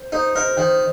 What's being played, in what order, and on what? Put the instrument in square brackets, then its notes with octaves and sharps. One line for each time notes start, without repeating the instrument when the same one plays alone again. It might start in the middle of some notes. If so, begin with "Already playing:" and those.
Already playing: [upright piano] C5
[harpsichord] D#4 [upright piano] C5
[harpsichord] A#4 [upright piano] C5 D#5
[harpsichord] D#3 [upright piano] C5